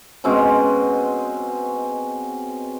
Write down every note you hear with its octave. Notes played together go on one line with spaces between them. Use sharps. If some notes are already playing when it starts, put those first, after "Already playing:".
B2 G#3 C4 C#4